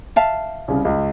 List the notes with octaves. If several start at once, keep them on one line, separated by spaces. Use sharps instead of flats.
E5 F5 A5
C2 C#3
C#2